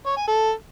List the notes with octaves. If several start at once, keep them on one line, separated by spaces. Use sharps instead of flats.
C#5
G#5
A4